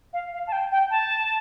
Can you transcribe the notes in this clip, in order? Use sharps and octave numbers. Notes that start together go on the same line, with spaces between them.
F5
F5
A5
G5
G5
A5